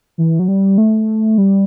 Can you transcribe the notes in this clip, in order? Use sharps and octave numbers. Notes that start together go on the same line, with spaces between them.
E3
F#3
G3
A3
G3